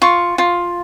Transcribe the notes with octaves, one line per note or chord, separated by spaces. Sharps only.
F4 C#6
F4